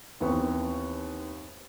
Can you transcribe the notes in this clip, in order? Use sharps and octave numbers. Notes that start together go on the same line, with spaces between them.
D#2 E3 B3 C4 C#6